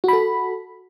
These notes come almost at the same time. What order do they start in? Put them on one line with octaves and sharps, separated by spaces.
F#4 B5 A4